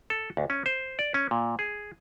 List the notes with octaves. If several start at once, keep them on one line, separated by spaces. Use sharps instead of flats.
A4
D2
C#4
C5
D5
C#4
A#2
G#4